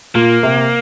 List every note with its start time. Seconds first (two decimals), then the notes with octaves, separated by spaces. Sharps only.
0.15 A#2 A#3
0.43 C3